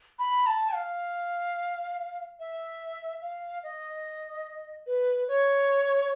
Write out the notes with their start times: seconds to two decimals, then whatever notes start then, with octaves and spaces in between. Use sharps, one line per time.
0.19 B5
0.47 A5
0.74 F5
2.40 E5
3.22 F5
3.63 D#5
4.87 B4
5.28 C#5